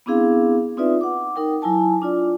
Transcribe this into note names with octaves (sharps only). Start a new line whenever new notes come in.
B3 C4 D4 E4 G#4 F5
C4 D#4 F4 B4 D5 E5
F#5 D6
D#4 A#4 G5
F#3 E4 G#5 A5
D4 F4 D5